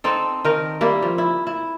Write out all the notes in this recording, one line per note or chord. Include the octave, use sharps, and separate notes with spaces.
C4 D#4 A4
D#3 D#4 A#4
G3 A#3 E4
F3
E4
E4